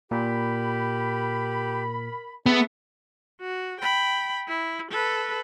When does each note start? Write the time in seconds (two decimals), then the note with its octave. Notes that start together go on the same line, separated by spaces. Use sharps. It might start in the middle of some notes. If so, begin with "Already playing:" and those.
0.11 A#2 G4 A#4 B5
2.46 B3 G#4 A4 E5 A5 C#6
3.41 F#4
3.80 G5 B5
4.48 E4
4.91 A4 B4